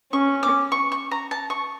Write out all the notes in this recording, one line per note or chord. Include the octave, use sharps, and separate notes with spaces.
C#4 C#6
D6
C#6
C#6
A#5
A5
C#6